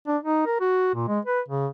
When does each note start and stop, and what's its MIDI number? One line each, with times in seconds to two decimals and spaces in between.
0.08 0.17 62
0.23 0.43 63
0.47 0.57 70
0.61 0.92 66
0.95 1.07 46
1.08 1.20 56
1.25 1.41 71
1.48 1.67 49